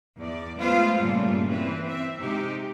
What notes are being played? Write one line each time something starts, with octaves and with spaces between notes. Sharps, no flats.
E2 D5
G#3 A3 B3 F4 C5
G2 A#2 C#3 G3 A3 F4
E3 C4 B4
C4 E5
C3 G#3 D#4 G4